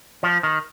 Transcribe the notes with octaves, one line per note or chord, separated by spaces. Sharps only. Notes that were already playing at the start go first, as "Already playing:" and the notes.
F3
D#3